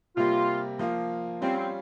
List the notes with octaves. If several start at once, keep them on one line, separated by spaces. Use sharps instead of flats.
C3 G3 A#3 F4
F3 A#3 F4
G3 C4 C#4 F4
C4